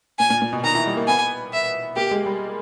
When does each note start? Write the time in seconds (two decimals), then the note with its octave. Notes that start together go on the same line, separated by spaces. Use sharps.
0.19 A#2 G#5
0.30 A#2
0.42 A#2
0.53 B2
0.64 D#3 A#5
0.75 E3
0.86 G3
0.97 A#3
1.08 B3 G#5
1.53 E5
1.96 A#3 G4
2.11 G#3
2.26 G3